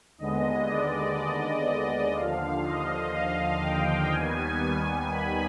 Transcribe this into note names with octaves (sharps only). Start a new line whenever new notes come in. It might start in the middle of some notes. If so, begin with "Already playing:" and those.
D#2 D3 G#3 B3 D#5
D5
D#5
D#5
D#2 D3 F3 F5
D#5
F5
G5
D#2 D#3 G3 B3 G#5
B5